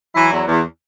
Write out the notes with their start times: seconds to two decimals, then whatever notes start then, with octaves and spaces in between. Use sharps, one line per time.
0.15 E3 F#3 E4
0.31 E2
0.47 E2